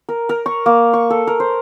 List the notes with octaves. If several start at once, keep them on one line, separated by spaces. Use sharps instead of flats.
A#4
A#4
C#6
A#3
C#6
A4
A#4
C5